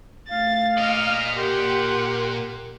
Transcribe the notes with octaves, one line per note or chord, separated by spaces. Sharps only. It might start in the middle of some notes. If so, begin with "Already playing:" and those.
A3 F5 A6
A#2 D5 D#5 F6
G4 A#4 F#5 C6